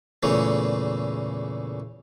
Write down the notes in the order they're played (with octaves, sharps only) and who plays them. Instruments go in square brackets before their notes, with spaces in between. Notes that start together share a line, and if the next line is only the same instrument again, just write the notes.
[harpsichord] E2 A#2 C#3 E3 A3